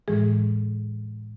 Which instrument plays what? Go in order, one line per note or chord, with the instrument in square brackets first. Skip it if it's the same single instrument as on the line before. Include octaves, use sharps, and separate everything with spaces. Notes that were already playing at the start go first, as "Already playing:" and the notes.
[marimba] A2 E3 G#3 G#4